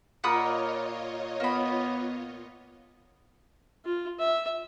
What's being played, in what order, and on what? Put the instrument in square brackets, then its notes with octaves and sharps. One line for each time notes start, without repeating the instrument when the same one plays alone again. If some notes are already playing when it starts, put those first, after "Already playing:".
[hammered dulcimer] A#2 A#4 [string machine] F4 C#5 D#5 [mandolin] F#5 B5 D#6
[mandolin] A#3 B5 [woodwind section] B3
[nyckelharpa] F4
E5